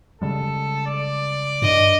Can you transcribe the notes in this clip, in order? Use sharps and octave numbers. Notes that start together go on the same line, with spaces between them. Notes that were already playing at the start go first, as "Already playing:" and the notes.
C#3 G3 G#3 A4
D5
G2 D#5